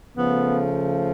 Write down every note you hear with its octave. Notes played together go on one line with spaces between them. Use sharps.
C#3 F3 A3 B3